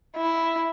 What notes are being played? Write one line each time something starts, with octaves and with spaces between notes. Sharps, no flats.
E4